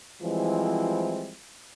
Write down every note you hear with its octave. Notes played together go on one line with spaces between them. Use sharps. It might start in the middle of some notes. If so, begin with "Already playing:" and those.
E3 F3 G3 G#3 C4 E4